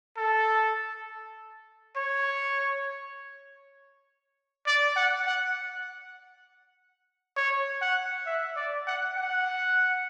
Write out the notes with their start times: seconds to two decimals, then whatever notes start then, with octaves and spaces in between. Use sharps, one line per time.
0.17 A4
1.97 C#5
4.67 D5
4.96 F#5
5.27 F#5
7.37 C#5
7.82 F#5
8.27 E5
8.56 D5
8.87 F#5
9.17 F#5